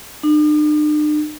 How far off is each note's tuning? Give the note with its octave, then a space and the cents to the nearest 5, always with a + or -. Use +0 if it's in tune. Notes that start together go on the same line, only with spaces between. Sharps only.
D4 +45